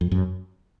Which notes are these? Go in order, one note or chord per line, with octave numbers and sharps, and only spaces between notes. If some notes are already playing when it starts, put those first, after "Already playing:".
F2
F#2